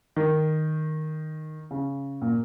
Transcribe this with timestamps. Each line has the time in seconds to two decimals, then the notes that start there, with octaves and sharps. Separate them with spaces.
0.16 D#3
1.71 C#3
2.22 A#2